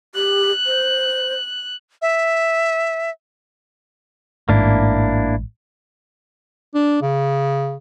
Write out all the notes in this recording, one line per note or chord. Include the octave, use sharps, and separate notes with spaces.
G4 F#6
C5
E5
A1 G#2 A#3 D4 E4
D4
C#3